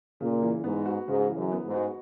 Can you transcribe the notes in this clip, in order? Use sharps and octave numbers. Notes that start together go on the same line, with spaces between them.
A#2 C#3
E3
G#2 B3
F#4
G#2 C#3
E3
F#2
B3
G#2
F#4